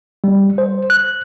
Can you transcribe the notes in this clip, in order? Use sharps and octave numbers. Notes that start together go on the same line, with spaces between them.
G3
C5
F#6